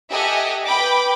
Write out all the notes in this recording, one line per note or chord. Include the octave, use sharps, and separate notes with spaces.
G4 A4 D#5 E5 F#5 G#5
B4 G5 B5 D6